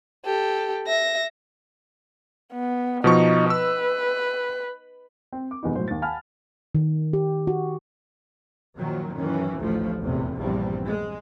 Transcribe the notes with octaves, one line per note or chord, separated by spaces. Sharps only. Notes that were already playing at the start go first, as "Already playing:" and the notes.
G4 A4
E5 A#6
B3
B2 F3 D#4 C#6
B4 E6
C4
D6
E1 E2 B3 D#4
A2 F#3 C5
D#2 A6
F5 F#5 G#5 A5 B5 F6
D#3
G4
F#4
F#2 A#2 D#3 F3 F#3
F#2 D#3 E3 C#4
A1 D2 F3 A3
F1 A#1 E2 A2 C3
A#1 E2 G2 G3 C4
G#3